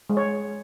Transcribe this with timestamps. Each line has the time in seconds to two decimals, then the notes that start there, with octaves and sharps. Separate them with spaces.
0.10 G#3
0.17 C#5